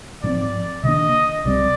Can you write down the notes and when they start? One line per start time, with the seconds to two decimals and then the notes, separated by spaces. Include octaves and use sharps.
0.23 G#2 F3 C4 D5
0.83 C3 D#3 A#3 D4 D#5
1.45 C2 C3 G3 C4 D5